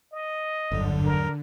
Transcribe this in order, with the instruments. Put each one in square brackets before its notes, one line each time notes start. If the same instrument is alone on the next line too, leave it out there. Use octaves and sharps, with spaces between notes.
[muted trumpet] D#5
[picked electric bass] G1 [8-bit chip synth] E2 G#2 F#3 [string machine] D3
[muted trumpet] A#4